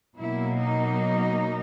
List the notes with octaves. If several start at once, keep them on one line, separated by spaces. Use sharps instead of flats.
B2 F#3 A#3 E4
D#4